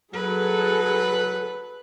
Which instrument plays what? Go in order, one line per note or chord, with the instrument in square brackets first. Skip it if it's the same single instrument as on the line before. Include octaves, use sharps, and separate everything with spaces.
[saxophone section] F#3 [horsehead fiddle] G#4 A4 [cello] B4